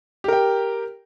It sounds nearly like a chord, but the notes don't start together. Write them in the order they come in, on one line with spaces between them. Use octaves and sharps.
G4 A#4 G5